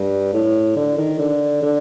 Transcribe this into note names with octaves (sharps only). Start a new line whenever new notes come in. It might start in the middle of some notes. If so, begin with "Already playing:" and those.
Already playing: G2
A2
D3
D#3
D3
D3